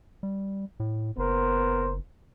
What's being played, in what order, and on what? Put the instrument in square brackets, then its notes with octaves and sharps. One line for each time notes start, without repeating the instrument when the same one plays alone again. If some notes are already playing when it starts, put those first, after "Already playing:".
[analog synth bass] G3
A2
[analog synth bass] F#1 [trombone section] B3 A#4 C5